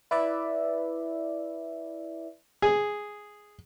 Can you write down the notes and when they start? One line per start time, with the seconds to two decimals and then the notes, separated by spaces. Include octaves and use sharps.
0.11 E4 B4 D5 E5
2.62 G#4